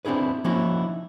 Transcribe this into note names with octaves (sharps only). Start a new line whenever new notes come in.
C4 D4 E4 G#4 B4
F3 A#3 C#4 D#4 E4 F#4